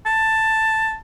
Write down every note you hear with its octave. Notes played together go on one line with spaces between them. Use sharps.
A5